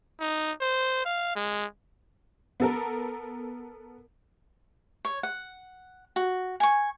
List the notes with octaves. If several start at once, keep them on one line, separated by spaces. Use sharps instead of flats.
D#4
C5
F5
G#3
B3 A4 A#4
C#5
F#5
F#4
G#5 C#6